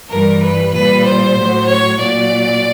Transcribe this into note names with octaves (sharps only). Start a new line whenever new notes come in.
G2 E3 G3 A#4
B4
A#2 G3 B4
C5
A2 F#3
C#5
A#2 F#3 D5